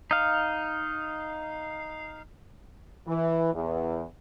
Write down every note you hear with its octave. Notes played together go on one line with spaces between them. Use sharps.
D#4 F5
E3
E2